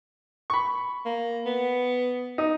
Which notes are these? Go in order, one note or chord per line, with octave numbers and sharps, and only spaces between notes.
B5 C#6
A#3
B3
D#4